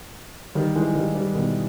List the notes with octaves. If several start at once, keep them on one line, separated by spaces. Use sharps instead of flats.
D#3 G3
E3 G#3
D#3 G3
D#3 G3
B2 D#3